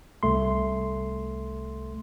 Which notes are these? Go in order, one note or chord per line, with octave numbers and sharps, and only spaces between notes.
C2 A3 C6